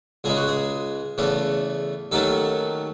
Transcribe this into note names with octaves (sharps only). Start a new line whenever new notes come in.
C#2 C#3 G#3 G#4
F#4
G#4
E2 C#3 E3 A3 C#4
D#2 D#3 F#3 A3 C#4 A4